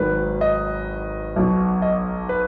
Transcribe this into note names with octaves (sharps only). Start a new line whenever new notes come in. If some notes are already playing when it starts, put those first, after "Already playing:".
Already playing: G#1 G#2 D#3 F#3 B4
D#5
B1 B2 F#3
D#5
B4